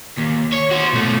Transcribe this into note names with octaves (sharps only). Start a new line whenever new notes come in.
D#2
C#5
F#4 C5
B2 A3